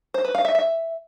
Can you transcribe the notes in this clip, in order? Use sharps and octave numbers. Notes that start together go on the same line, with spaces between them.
C5
B4
F5
E5
E5